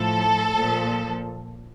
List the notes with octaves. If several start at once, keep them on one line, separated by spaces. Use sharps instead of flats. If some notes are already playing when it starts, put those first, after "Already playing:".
Already playing: A2 F3 A4
A#2 F3